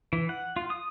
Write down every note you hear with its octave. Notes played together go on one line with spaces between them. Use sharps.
E3
F#5
F4
D#6